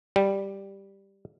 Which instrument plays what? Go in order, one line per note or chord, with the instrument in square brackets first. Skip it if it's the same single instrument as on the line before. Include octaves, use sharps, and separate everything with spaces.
[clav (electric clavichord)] G3